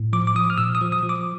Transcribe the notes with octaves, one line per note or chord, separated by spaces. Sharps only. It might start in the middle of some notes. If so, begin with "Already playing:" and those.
Already playing: A2
F3 D6
D6
F3 D#6
F6
A#2 E6
D#6
F3
D#6
F3
D6